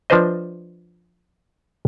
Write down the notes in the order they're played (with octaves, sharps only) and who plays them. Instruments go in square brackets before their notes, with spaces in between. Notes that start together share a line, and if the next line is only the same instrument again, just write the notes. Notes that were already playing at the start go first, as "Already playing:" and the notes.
[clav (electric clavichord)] F3 D4 B4 C5 D#5